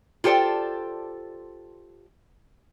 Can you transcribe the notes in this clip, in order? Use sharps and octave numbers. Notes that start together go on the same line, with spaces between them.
F4 G4 A4 C5 D5